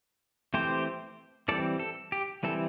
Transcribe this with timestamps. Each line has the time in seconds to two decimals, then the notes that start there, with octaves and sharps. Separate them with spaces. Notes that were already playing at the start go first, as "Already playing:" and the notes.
0.54 E3 A3 C4 G4 C5
1.48 E3 G3 C4 A4 D5
1.79 A4
2.12 G4
2.43 E3 G3 C4 A4